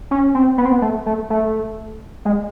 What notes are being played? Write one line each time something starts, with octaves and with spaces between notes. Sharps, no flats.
C#4
C4
B3
C4
B3
A3
A3
A3
G#3